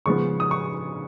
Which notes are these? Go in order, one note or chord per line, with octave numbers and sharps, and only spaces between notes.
C#3 F3 G#3 B3 C#6
D#6
C#6